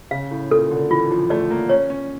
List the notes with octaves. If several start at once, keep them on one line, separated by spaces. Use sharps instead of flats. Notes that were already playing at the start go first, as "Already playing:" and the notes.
C#3 F5
A2
A#2 A4
D3
E3 F4
F3
A3 D5
A#3
C#4 C#5
C#4